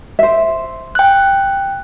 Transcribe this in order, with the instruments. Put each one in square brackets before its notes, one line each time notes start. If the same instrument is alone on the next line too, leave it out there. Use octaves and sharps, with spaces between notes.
[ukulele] C5 E5
[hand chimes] G5 F#6